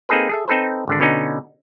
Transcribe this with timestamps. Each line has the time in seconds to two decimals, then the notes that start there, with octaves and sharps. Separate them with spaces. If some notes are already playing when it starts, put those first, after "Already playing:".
0.09 A#3 C4 D#4 G#4 A4 B4
0.29 G#4 A4 E5
0.48 C4 D#4 A4 B4 C5
0.88 G#1 D3 D4
1.00 B2 D3 B3 C#4 D#4